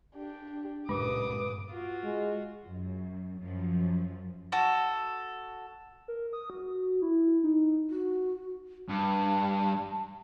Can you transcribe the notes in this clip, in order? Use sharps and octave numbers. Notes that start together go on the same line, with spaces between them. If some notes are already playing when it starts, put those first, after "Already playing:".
D4 G4
D1 C#2 G2 A#2 G#3 B4 D6 D#6
F4 F#4
G#3
F#2
F#2 F3
F#4 A4
A#4
D#6
F#4
E4
D#4
F#4
G2 A5